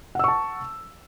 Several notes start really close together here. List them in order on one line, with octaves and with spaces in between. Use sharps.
F#5 E6 C#6 A5